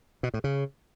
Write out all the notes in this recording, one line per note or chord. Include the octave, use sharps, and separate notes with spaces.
B2
A2
C#3